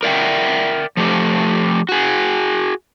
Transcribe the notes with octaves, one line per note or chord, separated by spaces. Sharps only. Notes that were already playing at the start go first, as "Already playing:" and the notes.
A#4 D5 E5 F#5 G5
F3 A3 G4
F#4 G#4